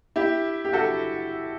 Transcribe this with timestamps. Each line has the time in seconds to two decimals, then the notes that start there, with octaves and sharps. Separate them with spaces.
0.16 E4 G4
0.65 G4
0.73 F#4 A4